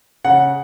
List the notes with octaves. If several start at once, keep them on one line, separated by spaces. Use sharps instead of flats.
C#3 F#5